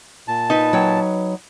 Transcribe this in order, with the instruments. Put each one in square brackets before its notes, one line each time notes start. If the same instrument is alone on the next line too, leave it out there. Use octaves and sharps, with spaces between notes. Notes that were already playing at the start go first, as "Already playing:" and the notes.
[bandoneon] A#2 A5
[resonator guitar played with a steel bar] D#4 B4
[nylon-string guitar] F#3 C#5 G5